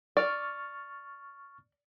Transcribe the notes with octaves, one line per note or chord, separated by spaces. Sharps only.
D5 C#6 F6 A6